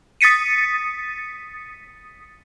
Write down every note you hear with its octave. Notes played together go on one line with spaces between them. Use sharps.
D#6 A6 B6 C#7 D#7